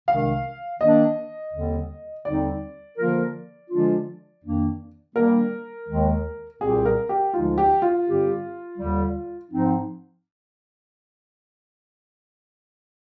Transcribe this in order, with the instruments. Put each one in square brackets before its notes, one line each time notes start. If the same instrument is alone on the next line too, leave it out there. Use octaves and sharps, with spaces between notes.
[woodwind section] C2 C3 D#3 G#3 D4 [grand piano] F5
[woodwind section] D#3 A#3 D4 [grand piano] D#5
[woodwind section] D#2 D3 G3 C4
[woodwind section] D#2 D3 G3 C4 D#4 [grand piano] D5
[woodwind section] D3 F3 A#3 F4 A#4
D3 F3 G#3 D4 F4
F2 D#3 A#3 D4
[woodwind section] D#3 G3 A#3 D4 [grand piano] A#4
[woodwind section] D#2 D#3 G#3
[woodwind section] C2 A#2 G3 C4 G4 [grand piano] G#4
[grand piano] A#4
G4
[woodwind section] D2 D3 F3 G#3 D#4 [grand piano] F4
[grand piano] G4
F4
[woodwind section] G2 D3 G3 C4 G4
D#2 D3 G3
G#2 F3 C4 D#4